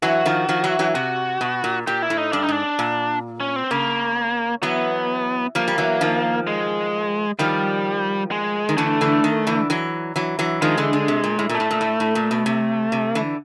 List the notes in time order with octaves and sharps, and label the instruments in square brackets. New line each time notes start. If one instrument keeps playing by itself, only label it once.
[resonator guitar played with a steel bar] E3 F#3 [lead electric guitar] F#4
[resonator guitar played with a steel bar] D#3 F3
D#3 F3
E3 F#3
E3 F#3
[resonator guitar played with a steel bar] C3 [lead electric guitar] F#4
[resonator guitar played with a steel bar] B2
A#2
[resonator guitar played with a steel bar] A#2 [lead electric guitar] G4
[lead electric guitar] E4
[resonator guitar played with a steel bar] A2
[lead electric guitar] D#4
[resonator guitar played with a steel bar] G2 [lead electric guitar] D4
[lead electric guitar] D#4
[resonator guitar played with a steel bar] G#2 [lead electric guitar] D4
[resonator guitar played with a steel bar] A#2
[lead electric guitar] C#4
C4
[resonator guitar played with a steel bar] C#3 [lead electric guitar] A#3
[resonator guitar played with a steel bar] E3 F#3 [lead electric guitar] B3
[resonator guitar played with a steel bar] F3 G3 [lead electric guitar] A#3
[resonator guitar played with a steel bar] G3
E3 F#3
D#3 F3
[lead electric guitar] G#3
[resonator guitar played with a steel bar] D#3 F3 [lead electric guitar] G3
[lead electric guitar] G#3
[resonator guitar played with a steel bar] D#3
[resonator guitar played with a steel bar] D3 E3 [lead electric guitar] A3
[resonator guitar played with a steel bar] D3 E3
D#3
D3 E3
E3 F#3
E3 F#3
E3 F#3
[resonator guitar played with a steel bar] D#3 F3 [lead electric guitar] G#3
[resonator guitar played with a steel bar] D3 E3
D3
C3
A#2
A2
A#2
[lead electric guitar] A3
[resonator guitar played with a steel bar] A2
A#2
A2
A2
A#2
B2
C3
C3
D3 E3